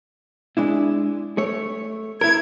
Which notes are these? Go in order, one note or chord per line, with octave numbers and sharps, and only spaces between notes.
G#3 D4 E4
A3 C#5
E4 A#4 G#6